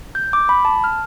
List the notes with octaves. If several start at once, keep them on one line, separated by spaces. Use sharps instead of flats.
G6
D6
B5
A5
F6